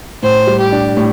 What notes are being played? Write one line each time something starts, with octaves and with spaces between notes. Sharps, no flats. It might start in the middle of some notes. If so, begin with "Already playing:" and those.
A2 C5
G3
G4
D4
A2